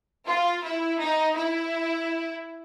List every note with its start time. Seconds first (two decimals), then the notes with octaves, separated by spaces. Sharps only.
0.27 F4
0.64 E4
0.99 D#4
1.36 E4